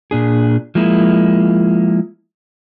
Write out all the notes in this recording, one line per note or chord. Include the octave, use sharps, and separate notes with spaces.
A#2 D4 G#4
F3 G#3 A#3 E4